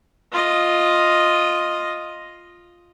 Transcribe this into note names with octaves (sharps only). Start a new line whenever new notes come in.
F4 D#5